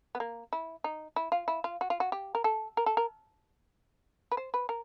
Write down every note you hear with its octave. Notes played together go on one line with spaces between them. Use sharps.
B3
A#3
E4
D#4
E4
F4
E4
F4
F#4
F4
F#4
G4
A#4
A4
A#4
A4
A#4
B4
C5
B4
A#4